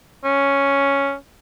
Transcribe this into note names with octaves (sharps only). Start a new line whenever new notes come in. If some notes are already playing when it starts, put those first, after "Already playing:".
C#4